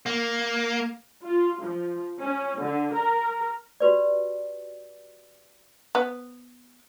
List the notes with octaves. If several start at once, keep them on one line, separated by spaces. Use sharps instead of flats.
A#3
F4
F3
C#4
D3
A#4
F#4 G4 B4 D5
B3